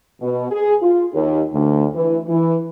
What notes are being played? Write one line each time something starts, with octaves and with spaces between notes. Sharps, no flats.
B2
G#4
F4
D#2
D2
E3
E3